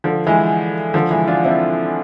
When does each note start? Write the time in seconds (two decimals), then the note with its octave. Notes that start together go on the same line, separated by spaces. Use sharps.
0.04 D3 F3
0.27 E3 G#3
0.94 D3 F3
1.11 E3 G#3
1.28 D4 F4
1.44 C4 E4